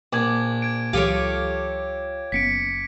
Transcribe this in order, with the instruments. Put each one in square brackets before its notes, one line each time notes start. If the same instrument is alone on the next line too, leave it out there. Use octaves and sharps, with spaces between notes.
[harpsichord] A#1 [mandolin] D5 [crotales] D6 G#6
[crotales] G#6 D7
[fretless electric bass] C#2 E3 F#3 [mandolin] F4 A4 C#5 [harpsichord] G4
[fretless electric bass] F#1 B3 C#4 [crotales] B6 C#7 D7